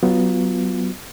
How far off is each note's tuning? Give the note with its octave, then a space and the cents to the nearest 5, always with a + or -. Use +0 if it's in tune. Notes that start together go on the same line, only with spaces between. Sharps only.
F#3 +20 B3 +5 F4 +0